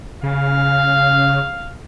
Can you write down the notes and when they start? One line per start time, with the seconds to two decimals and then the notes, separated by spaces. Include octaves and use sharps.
0.23 C#3 F5